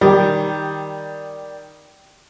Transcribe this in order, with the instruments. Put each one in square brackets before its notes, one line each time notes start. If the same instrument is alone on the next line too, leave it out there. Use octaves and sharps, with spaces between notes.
[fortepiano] D#3 G3